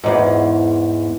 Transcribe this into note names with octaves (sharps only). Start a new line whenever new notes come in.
E2 G#2